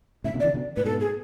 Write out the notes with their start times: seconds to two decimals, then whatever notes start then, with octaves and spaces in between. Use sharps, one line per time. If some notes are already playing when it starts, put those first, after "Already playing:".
0.24 A2 C#3 E5
0.34 B2 D3
0.39 D5
0.44 C#3 E3
0.54 B2 D3
0.76 A2 B4
0.84 G#2 B2 A4
1.00 G#4